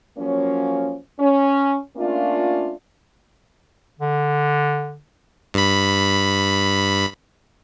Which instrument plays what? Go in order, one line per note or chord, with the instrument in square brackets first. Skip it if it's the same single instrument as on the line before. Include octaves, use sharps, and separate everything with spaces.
[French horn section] F3 F#3 A#3 C#4
C#4
A3 A#3 C#4 D4 F4
[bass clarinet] D3
[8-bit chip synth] G2 B5